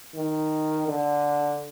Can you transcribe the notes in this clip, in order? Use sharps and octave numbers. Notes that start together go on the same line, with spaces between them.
D#3
D3